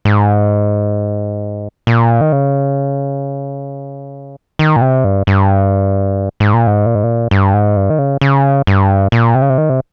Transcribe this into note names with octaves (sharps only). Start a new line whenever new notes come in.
G#2
A#2
D#3
C#3
D#3
A#2
C3
G2
G2
G#2
A#2
G#2
A#2
G#2
A#2
G2
G#2
G2
D#3
C#3
C#3
G2
A#2
C3
C#3
C3
D#3
C3